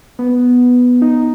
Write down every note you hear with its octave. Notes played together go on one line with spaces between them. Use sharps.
B3
D#4